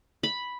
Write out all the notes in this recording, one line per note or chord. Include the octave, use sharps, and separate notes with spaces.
B5